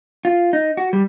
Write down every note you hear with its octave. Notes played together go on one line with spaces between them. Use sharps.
F4
D#4
F#4
G3